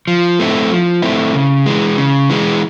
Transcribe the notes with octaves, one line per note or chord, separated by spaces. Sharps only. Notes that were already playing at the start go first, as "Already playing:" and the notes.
F3
A3 C4 E4
F3
A3 C4 E4
C#3
E3 G#3
C#3
E3 G#3